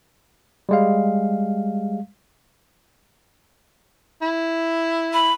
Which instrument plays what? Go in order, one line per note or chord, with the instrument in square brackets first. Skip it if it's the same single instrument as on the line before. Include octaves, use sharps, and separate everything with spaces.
[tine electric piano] G3 G#3 F5
[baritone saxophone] E4
[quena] B5